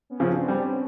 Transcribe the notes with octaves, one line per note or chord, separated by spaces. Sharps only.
B3 C#4
C#3 F3
C4 D4
C4
G3 B3 C#4